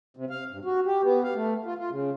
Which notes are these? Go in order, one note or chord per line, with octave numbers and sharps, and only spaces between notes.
C3
F5
G2
F#4
G4
B3
F5
A3
F4
F4
C#3